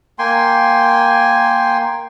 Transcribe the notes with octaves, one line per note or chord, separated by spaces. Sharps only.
A#3 G5 G#5 C6